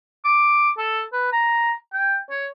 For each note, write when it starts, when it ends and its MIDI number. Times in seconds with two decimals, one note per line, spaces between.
0.25 0.70 86
0.78 1.02 69
1.13 1.29 71
1.32 1.73 82
1.93 2.17 79
2.30 2.46 73